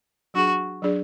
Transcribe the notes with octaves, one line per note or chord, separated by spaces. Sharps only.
F#3 D4 F#4 G#4
F#3 D4 G#4 D5